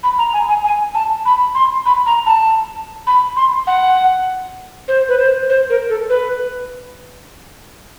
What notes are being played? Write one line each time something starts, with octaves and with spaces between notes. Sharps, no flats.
B5
A#5
G#5
G#5
G#5
A5
B5
C6
B5
A#5
A5
B5
C6
F#5
C5
B4
C5
C5
A#4
A4
B4